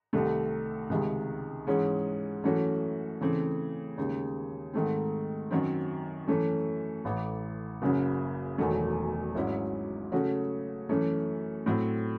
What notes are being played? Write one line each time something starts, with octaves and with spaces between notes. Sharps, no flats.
C2 C3 D#3 A3 C4
C#2 C3 D#3 G#3
G#2 E3 G#3 C#4 G#4
F#2 E3 A3 C#4 F#4
C#3 E3 A3 C4
D#2 C#3 G#3
G#2 D#3 A3 C4
F#2 D#3 F#3 C4
F#2 E3 A3 C#4
A1 A2 E3
F#1 F#2 C#3 F#3
E1 E2 D#3 F#3 A3
G#1 G#2 F#3 C#4 E4
C#3 F#3 A3 C#4 F#4
F#2 E3 A3 C#4
A2 F#3 C4